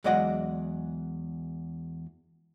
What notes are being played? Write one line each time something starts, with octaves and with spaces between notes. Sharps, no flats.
E2 F#3 G#3 D5 D#5 F#5